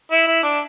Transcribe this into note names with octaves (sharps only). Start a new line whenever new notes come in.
E4
E4
D4